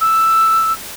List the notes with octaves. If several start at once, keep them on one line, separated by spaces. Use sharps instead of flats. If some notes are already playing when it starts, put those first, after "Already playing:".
E6